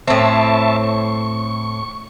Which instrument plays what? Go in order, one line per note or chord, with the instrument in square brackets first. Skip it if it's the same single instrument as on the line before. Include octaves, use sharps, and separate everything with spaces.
[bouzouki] A2 C4 [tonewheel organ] E5 A5 C#6
[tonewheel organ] C#6